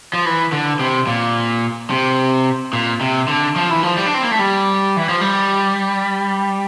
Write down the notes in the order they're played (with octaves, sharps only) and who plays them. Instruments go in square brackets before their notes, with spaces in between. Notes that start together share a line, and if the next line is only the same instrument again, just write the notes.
[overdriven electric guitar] F3
E3
D3
C3
A#2
C3
A#2
C3
D3
F3
E3
F3
G3
D4
C4
A#3
A3
G3
E3
F3
G3